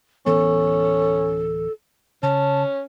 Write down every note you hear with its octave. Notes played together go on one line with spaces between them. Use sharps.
D1 E3 B3 C#4 A4
C#3 C#4 A5